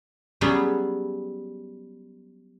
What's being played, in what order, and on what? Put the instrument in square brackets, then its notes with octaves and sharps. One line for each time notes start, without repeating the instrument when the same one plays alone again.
[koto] F#3 G3 B3 C#4 G#4